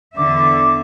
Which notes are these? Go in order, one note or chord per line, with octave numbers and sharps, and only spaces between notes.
E2 D3 E5 D6